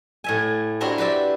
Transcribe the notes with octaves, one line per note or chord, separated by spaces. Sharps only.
A2 E5 G#5
D4 E4 F#4 G4 A#4 C5
B4 C5 D5 E5